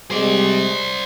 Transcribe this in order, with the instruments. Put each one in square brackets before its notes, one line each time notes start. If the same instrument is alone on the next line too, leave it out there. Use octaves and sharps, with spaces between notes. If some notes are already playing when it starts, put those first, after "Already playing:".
[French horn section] C3 G3 G#3 [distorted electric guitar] C5 D5